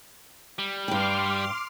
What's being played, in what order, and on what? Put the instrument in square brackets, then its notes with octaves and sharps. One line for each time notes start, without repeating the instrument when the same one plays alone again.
[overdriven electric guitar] G3
[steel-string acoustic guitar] G2 G5 [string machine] C6 D6 F6